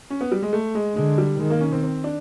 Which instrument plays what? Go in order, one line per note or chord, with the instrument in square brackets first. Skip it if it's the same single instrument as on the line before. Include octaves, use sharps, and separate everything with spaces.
[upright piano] C#4
B3
G3
G#3
A3
G#3
[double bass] D3 [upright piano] G#3
[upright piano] G3
[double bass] D#3 [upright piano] G#3
[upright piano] A#3
C#4
C4
C4
D4